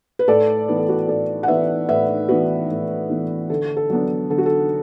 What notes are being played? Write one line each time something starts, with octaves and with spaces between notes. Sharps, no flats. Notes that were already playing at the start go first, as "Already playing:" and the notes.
B4
A2 A4 D5
E3 B3 B4
A4
F#4 B4
A2 A4 D5
F#5
E3 B3 B4 E5
A2 B4 E5
E3 B3 F#4 B4
A2
E3 B3
D3 A4
A4
F#3 B3 D4
D3 A4
F#4
A4